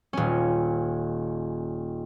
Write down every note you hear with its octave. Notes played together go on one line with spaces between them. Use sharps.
D#1 C#4